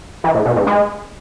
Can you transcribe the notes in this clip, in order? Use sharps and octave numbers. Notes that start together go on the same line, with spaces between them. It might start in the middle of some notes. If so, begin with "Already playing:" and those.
E3
A2
B2
G#2
G#3